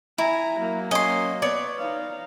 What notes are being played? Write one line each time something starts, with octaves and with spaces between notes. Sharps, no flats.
E4 G#5 A#5
F#3 A#3
C#4 D#5 C6
B3 C#5 D5
D#4 F5